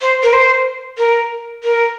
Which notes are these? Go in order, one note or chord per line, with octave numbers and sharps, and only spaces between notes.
C5
A#4
C5
A#4
A#4